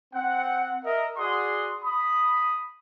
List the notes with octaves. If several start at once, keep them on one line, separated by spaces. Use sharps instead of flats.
C4 F#5
A#4 D#5 E5
F#4 G#4 D5 F#5 C6 D#6
B5 D#6